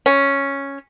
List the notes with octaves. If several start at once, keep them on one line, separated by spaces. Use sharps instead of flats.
C#4